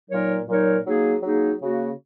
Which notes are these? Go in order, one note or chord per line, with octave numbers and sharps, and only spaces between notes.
A#2 F#3 D#4 A#4 C#5
A#2 F#3 D#4 A#4 C#5
F#3 A#3 D#4 G#4
F#3 A#3 D#4 G#4
C#3 A#3 F#4